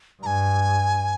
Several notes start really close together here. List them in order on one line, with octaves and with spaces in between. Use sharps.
G2 A#5 G#5